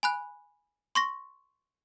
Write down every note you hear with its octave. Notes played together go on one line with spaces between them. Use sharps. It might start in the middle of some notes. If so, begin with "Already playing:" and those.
G#5 B5 F#6
C6 C#6 A#6